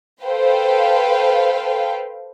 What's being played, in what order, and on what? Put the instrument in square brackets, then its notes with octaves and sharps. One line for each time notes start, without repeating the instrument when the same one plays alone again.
[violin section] A4 B4 C5 F5 G5